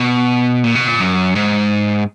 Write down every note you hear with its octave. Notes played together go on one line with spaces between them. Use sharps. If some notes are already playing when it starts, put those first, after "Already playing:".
Already playing: B2
A#2
B2
A#2
F#2
G#2